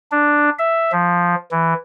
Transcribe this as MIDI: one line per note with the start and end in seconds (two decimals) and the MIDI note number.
0.12 0.50 62
0.59 0.92 76
0.92 1.35 53
1.51 1.74 52